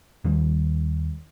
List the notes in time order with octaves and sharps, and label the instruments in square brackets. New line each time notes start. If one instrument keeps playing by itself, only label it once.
[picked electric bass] D#2 D#3 G3 C#4